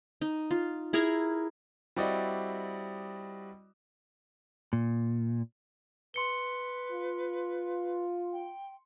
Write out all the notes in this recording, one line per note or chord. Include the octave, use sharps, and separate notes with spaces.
D#4
F4
E4 G#4 A#4 A#5
G3 C4 E4 F#4 D5 D#5
A#2
B4 C6 C#7 G7
F4
G5